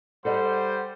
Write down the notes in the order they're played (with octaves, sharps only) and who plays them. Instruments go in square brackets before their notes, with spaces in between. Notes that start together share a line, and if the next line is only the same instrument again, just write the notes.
[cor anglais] G3 [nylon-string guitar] A4 D5 D#5 [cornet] C5 [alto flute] F#5